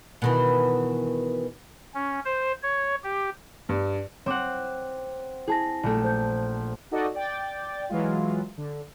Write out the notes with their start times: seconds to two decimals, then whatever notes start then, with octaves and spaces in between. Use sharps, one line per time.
0.22 B2 D#3 E3
1.94 C#4
2.25 C5
2.63 C#5
3.03 G4
3.69 G2
4.26 C4 C#5 F#5 D6
5.48 E4 G#4 A5 A#6
5.83 A#1 A3
6.04 C5 G6
6.91 D#4 F#4 A4 D5 D#5
7.15 D5 G5 A6
7.89 E3 F#3 G#3 F4
8.58 D3